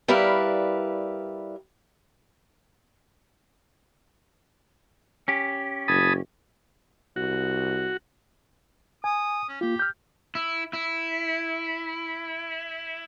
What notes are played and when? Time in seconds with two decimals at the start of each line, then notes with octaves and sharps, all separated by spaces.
0.08 G3 E4 A#4 B4 D5 F5
5.28 C#4 G4
5.88 F#1 A5 B5 D#6 G#6
7.16 C2 F#4
9.04 G#5 D#6
9.49 C#4
9.61 A#3 F4 G4
9.79 F6 G6
10.35 E4
10.73 E4